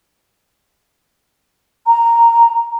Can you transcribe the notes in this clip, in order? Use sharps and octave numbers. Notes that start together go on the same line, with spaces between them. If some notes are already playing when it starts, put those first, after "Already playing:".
A#5